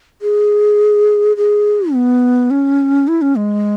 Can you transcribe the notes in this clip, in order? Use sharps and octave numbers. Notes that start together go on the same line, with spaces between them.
G#4
G#4
B3
C#4
E4
C#4
G#3